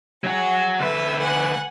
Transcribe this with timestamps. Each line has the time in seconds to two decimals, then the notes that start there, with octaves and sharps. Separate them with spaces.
0.24 F#3 F#4 G#4 F#5
0.79 D2 A4 B4 E5
1.19 F#5 G#5 F#6